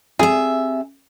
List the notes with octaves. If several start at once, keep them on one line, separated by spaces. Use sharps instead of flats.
C3 G#4 E5